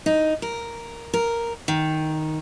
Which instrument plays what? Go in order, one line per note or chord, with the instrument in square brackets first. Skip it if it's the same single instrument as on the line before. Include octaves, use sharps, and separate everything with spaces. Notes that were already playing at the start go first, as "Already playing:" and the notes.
[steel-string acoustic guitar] D#4
A#4
A#4
D#3